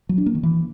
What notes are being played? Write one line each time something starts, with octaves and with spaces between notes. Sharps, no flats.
F#3
D4
A#3
D#3
E3